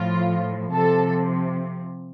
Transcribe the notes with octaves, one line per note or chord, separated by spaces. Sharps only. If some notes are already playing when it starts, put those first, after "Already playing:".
Already playing: A2 F3 F4
C3 F3 A4